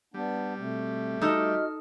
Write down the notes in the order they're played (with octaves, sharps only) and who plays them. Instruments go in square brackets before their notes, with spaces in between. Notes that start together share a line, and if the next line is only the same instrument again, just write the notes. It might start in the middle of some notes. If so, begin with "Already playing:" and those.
[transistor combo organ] G3 [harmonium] B3 D4
[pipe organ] B2 C4 [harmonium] A3
[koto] D#4 A4 [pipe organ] F#4 D#5 F6